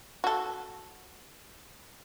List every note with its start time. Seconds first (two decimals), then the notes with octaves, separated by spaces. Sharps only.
0.24 F#4 A4